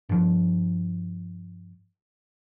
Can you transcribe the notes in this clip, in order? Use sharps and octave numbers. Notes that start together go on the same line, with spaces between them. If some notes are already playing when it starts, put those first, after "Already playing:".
G2 F3